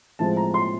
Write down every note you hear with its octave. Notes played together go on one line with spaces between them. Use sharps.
A2 F3 G#3 C4 A5
A#5
C6